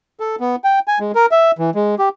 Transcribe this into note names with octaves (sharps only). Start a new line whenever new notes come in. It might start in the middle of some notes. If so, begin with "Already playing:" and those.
A4
B3
G5
G#5
G#3
A#4
E5
E3
G#3
G4